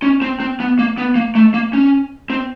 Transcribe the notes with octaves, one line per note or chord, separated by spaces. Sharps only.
C#4
C4
C4
B3
A#3
B3
A#3
A3
A#3
C#4
C4